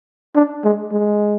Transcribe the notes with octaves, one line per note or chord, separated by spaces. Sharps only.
D4
G#3
G#3